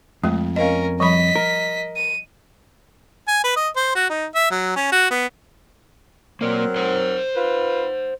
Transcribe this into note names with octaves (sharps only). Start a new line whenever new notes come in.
F2 G#3 A3
C#4 A#4 D#5 F5
F3 G3 D#5 B5 B6
A#4
D#7
G#5
B4
D#5
C5
F#4
D#4
E5
F#3
C#4
F#4
B3
F#3 A#3 C4 A#4 D5
C5 F#5
F4 B4